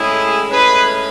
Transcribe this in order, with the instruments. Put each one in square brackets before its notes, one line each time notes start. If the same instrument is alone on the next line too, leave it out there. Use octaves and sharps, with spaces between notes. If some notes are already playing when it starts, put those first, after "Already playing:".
Already playing: [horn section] A2 G#3 C#4 E4 G#4
A2 G#3 C#4 G#4 B4